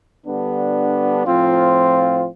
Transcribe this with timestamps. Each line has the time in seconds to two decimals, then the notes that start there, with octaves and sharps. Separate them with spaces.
0.25 D3 G3 B3 D4
1.26 A2 F3 C4 F4